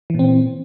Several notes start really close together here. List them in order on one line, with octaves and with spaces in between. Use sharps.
E3 A#2 C4